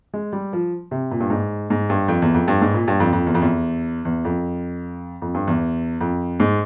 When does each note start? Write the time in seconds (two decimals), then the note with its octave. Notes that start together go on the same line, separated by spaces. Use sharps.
0.14 G#3
0.33 G3
0.53 F3
0.91 C3
1.11 A#2
1.20 G2
1.30 G#2
1.70 G#2
1.90 G2
2.08 F2
2.22 E2
2.34 F2
2.48 G2
2.61 G#2
2.74 A#2
2.88 G2
3.00 F2
3.13 F2
3.27 E2
3.35 F2
3.42 E2
4.05 E2
4.25 F2
5.22 F2
5.35 G2
5.47 E2
6.01 F2
6.40 G#2